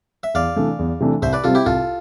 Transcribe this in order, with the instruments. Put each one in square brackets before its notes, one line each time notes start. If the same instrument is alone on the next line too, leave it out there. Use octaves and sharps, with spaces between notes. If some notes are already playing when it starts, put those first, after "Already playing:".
[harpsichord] E5
[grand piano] E2 [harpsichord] D5 F5
[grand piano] C3 E3 A3 D4
E2
C3 E3 A3 D4
[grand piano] C2 [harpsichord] C5 E5
[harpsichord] B4 D5
[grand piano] C3 G3 C4 [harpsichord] F4 A4
[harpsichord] E4 G4
[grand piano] C2 [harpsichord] F4 A4